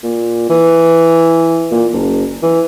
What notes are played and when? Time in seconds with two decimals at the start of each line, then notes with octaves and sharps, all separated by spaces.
0.03 A#2
0.49 E3
1.71 A#2
1.94 F#1
2.42 E3